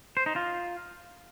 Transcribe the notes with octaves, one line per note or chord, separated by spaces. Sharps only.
C5
D#4
F4